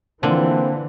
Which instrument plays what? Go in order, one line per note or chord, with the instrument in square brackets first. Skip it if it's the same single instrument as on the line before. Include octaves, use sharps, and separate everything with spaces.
[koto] D3 [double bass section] E3 [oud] A#3 F4 [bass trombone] C4